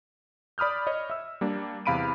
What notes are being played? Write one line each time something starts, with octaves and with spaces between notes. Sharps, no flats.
D5 B5 D#6 F6 G6
C#5 D#5
E5 E6
G3 A#3 D4
E2 C3 F5 B5 D7 D#7